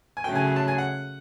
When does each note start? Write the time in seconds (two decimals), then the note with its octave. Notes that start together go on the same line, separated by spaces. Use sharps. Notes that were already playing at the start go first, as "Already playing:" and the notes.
0.17 G#5
0.24 C#3 F#3 A3 G5
0.36 G#5
0.46 G#5
0.56 A5
0.68 G#5
0.78 F#5